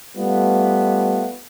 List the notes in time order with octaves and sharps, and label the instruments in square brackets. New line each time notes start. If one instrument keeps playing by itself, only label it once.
[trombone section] G3 A3 B3 F4